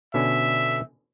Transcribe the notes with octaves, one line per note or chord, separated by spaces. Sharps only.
B2 D3 C#4 E5